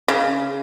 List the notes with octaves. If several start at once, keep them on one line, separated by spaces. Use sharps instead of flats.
C#3